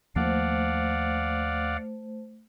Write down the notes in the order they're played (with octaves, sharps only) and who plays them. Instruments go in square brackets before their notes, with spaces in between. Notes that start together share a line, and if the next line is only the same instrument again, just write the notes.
[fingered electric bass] D#2 F3 A#3 [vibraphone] A3 C5 [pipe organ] D5 F5 F#5